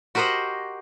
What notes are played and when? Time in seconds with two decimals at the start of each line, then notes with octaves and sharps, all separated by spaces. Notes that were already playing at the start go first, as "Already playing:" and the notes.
0.15 F#4 G4 A#4 C5 D#5 F#5